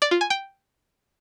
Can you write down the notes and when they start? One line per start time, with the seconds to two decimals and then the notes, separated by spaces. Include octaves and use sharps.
0.02 D5
0.11 F4
0.21 G#5
0.30 G5